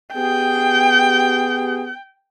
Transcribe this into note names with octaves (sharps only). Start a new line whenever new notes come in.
B3 G4 G#4 G5